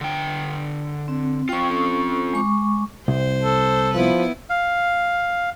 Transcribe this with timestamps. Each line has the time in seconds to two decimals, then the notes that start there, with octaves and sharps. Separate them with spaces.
0.01 D3 G5
1.08 C4
1.49 C4 F4 G5 C#6
1.68 C#4 A4 C#6
2.34 G#3 C#6 D6
3.08 C2 C5
3.41 A4
3.95 F3 B3 E4 B4
4.50 F5